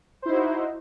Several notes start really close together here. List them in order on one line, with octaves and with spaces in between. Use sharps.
C5 E4 D#4 F#4